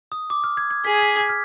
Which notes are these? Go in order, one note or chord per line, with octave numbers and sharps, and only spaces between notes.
D#6
D6
F6
G#6
G#6
G#4 B6
B6
G#6
F6